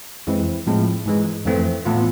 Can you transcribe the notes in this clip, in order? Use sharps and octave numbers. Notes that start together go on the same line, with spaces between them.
F2 E3 G#3 C4 E4
A2 F3 G#3 C4
G#2 E3 G#3
F2 E3 A3 C4
A2 E3 B3 F4